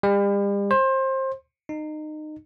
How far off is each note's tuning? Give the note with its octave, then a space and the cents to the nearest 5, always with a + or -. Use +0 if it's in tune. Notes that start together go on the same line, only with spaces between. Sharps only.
G3 +40
C5 +25
D#4 -25